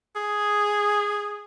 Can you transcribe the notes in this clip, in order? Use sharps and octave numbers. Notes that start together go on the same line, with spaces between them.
G#4